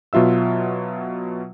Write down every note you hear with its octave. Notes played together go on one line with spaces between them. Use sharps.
B2 F#3 F4 E5 E6